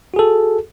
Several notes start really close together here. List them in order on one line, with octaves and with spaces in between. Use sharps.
F#4 G#4 A4